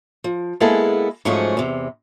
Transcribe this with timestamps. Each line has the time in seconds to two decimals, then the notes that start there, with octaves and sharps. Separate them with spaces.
0.24 F3
0.60 G#3 A#3 B3 E4 G#4 A4
1.25 G#2 F3 F#3 A3 C#4 G#4
1.57 E2 C3